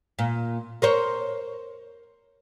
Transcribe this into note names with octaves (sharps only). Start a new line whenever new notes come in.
A#2
A#4 C5 C#5